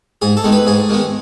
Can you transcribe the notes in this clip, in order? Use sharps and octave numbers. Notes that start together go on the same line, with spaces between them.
G#2 G#4
A4
D#3 G#3 B3
B4
G#2 G#4
D#3 G#3 B3